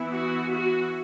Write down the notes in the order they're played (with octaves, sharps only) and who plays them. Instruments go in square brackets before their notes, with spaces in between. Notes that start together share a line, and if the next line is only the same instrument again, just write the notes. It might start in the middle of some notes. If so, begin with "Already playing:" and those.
Already playing: [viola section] E3 B3 E4
F#4
F#4